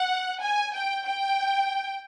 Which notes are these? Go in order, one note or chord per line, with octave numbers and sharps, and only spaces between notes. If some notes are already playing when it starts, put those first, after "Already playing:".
Already playing: F#5
G#5
G5
G5